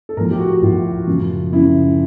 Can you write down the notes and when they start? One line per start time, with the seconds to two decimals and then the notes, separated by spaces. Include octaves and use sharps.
0.09 A4
0.17 A2 F3 A#4
0.31 G4
0.39 F#4
0.62 A2 F3 F4
1.07 F#2 C#3 F3
1.52 F#2 C#3 F3 E4